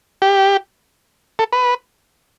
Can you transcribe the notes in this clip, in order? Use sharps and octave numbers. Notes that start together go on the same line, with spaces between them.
G4
A4
B4